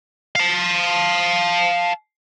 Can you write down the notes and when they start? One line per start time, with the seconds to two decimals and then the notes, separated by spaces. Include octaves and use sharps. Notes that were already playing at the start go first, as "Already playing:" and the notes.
0.35 F5 A5